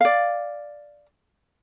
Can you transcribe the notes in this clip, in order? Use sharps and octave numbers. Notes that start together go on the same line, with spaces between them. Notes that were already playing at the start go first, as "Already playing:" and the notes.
D5 F5